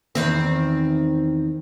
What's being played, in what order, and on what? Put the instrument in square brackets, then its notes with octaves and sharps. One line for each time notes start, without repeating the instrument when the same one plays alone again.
[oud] E2 D#3 C4